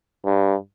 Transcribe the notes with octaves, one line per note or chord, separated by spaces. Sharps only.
G2